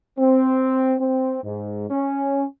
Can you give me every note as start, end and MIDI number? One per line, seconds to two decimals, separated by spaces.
0.18 0.96 60
1.00 1.41 60
1.43 1.86 44
1.91 2.44 61